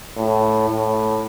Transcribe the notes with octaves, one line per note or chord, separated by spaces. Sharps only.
A2
A2